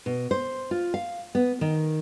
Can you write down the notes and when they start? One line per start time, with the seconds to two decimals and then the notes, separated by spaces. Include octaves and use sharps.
0.06 B2
0.31 C5
0.71 F4
0.94 F5
1.35 B3
1.61 D#3